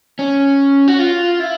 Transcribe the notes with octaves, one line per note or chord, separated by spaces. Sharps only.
C#4
F#4
F4
E4